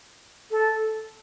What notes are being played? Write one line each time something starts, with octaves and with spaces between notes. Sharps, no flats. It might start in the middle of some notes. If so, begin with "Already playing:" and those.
A4